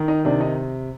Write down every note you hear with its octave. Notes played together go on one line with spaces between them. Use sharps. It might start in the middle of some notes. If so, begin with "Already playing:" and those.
Already playing: D#3
D#4
C3 D4
D#4